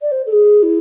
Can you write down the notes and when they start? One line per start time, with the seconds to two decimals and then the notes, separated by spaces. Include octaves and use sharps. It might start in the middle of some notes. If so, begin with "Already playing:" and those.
0.02 D5
0.11 C5
0.26 A4
0.32 G#4
0.63 E4